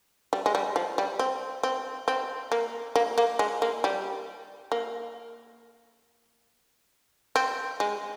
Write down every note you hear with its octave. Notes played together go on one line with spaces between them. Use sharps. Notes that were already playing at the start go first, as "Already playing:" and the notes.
G3
G#3
G3
F3
G3
C4
C4
C4
A#3
A#3
A#3
G#3
A#3
G3
A#3
C4
G#3